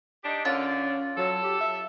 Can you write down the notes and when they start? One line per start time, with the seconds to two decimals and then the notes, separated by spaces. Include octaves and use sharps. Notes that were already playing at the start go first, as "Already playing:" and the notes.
0.24 D4 D#4 G4
0.45 A#2 D3 C#4 F4
1.17 F#3 A4
1.43 G4
1.61 E5